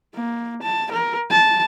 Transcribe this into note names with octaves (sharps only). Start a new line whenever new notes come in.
A#3
A5
A#4
A5